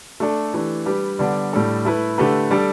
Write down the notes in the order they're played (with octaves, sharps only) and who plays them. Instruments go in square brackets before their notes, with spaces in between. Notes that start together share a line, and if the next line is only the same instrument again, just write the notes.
[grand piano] A3 D4 A4
E3 A3 D4 G4
G3 D4 G4 B4
D3 G3 B3 D4
A2 G3 D4 A4
A3 E4 B4
D3 A3 G4 B4
G3 D4 A4